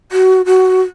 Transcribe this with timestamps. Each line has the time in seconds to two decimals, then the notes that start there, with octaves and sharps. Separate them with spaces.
0.12 F#4
0.46 F#4